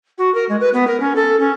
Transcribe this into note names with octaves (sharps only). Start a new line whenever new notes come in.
F#4
A#4
G#3
B4
B3
A#4
C#4
A4
C#4